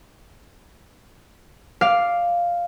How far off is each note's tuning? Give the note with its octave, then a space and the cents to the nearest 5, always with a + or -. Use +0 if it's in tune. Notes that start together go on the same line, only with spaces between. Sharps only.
D5 +0 F5 +0